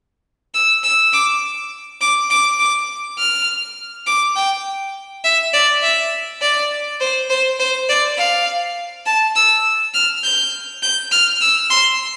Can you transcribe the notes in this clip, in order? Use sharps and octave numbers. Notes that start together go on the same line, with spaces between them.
E6
E6
D6
D6
D6
D6
F6
D6
G5
E5
D5
E5
D5
C5
C5
C5
D5
F5
A5
E6
F6
G6
G6
F6
E6
C6